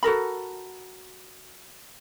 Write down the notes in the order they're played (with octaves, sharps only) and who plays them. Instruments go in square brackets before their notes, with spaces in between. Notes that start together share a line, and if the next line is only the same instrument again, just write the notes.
[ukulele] F#4 A4 A#4 B5